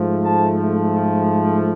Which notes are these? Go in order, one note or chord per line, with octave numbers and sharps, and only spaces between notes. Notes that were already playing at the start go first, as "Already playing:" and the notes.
Already playing: G#2 F3 A3
A5